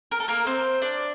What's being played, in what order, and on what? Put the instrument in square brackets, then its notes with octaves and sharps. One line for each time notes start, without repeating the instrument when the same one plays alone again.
[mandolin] A#4
A4
A#3 A#4
C4 C5
D4 D5